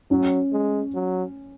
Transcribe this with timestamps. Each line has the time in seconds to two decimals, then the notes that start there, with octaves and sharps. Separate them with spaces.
0.11 F#3 C#4
0.52 G#3
0.94 F#3